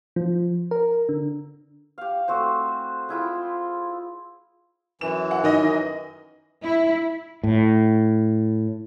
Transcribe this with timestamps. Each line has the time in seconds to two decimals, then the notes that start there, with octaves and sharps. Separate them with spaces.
0.16 F3
0.71 A#4
1.09 D3
1.98 G4 F5
2.28 A3 C4 F#4 C5
3.09 G#3 E4 F4 G5
5.01 F#2 E3 E7
5.31 F#5
5.44 D#3 D#5 A#6
6.64 E4
7.43 A2